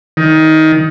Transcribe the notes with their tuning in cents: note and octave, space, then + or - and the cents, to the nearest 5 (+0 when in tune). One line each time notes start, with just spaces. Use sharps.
D#3 +20